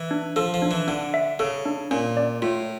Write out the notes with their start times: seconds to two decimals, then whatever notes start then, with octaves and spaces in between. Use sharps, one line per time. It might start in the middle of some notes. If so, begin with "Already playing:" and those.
Already playing: E3
0.11 D4
0.36 F3 A4
0.54 F3
0.62 D4
0.71 E3
0.88 D3 D4
1.14 E5
1.39 C#3 A4
1.65 D4
1.91 A#2 C#4
2.17 D5
2.42 A2 F4